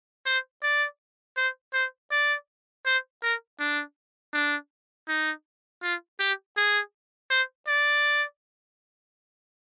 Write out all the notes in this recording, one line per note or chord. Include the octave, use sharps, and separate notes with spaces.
C5
D5
C5
C5
D5
C5
A#4
D4
D4
D#4
F4
G4
G#4
C5
D5